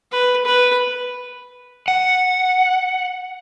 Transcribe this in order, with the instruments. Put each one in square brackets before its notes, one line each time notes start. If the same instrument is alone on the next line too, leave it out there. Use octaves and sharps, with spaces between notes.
[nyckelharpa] B4
B4
[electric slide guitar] F#5